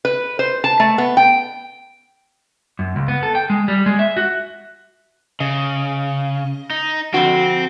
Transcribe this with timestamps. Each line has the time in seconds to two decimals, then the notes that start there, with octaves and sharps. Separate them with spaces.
0.05 B4
0.39 C5
0.64 A5
0.80 A3
0.98 B3
1.17 G5
2.79 F#2
2.96 C#2
3.08 B3
3.23 A4
3.35 G5
3.50 G#3
3.68 G3
3.86 G#3
3.99 E5
4.17 F#4
5.40 C#3 D#5
6.70 D#4
7.14 F2 D3 C4 F#4